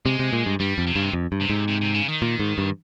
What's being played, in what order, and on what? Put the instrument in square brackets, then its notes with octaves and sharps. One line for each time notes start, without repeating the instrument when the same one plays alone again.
[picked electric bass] C3 [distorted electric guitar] G#3
[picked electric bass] C3
A#2
G2
[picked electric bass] G2 [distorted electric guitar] G3
[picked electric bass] F2
[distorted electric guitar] C3
[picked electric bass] G2 [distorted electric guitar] C#3
[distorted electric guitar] C3
[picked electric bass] F2
G2
[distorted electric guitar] C3
[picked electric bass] G#2
[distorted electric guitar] C3
C3
C#3
D#3
[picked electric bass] A#2
G#2
G2